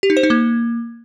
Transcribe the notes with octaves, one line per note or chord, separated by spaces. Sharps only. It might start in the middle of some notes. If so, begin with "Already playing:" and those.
G4
D#4
C5
D#4
A#3